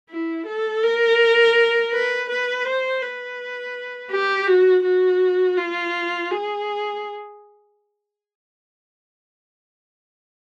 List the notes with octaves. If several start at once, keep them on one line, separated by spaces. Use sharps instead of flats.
E4
A4
A#4
B4
B4
C5
B4
G4
F#4
F#4
F4
G#4